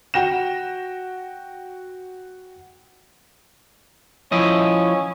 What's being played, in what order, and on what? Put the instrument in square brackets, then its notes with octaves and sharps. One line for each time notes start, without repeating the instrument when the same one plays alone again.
[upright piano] F#4 G5 A#6 E7
[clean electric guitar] F3 E4 D#5 [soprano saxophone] C#4